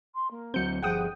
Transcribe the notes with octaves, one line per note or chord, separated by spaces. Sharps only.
C6
A#3
D2 F#3 C4 G6 C#7
G1 F3 G#4 F#5 G5 D#6